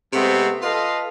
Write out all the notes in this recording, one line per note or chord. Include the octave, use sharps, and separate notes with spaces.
C3 G#3 A3 B3 C4
F4 A4 B4 D#5 F5